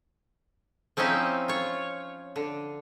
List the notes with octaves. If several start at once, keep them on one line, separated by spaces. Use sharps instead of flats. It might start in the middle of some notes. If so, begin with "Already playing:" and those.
F3 C4 C#4 D#4 E4
F4 C#5
D3